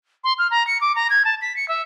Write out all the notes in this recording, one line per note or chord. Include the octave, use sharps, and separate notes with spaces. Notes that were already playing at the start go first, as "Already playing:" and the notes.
C6
F6
A#5
C#7
D6
A#5
G#6
A5
B6
C#7
E5